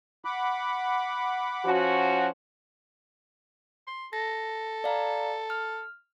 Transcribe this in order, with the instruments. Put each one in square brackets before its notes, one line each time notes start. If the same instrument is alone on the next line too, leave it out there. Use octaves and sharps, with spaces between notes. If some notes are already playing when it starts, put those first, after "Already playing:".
[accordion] F#5 B5 D6
[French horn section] F3 C#4 F#4
[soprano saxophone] C6
[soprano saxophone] A4 [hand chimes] A#6
[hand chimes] D5 F5 A#5
F6